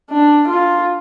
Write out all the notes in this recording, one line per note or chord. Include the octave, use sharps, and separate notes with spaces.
D4
F4